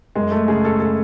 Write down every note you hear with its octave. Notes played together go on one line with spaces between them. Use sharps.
F#2 G#3
A3
C#3 G#4
A4
A4